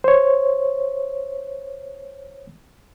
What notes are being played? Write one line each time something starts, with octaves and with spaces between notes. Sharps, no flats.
C5 C#5